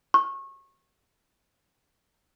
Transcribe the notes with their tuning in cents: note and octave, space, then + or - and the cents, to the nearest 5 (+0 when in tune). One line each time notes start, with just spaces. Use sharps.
C#6 -25